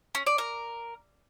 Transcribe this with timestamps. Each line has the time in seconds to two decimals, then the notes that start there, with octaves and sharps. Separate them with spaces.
0.15 C#4
0.26 D5
0.38 A#4